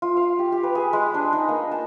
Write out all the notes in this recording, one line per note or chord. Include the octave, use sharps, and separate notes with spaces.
F4
F5
G4
G4
B4
G#4
G#3
D4
D#4
A#3
A5